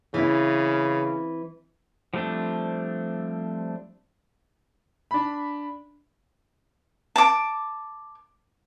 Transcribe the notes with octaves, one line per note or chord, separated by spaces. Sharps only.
C#3 E3 C4 E4
F3 G3 A3 C4 D4
D4 B5
A5 D6